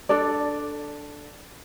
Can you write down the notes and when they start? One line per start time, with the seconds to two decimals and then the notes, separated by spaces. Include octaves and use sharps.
0.09 D4 A4 D5